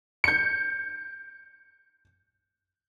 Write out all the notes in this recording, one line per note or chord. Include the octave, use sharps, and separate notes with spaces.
G6 C#7